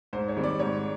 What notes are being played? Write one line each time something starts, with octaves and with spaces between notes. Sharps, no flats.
G#2 C5
C#5
D#3 G3 C4
D5
G#2 C#5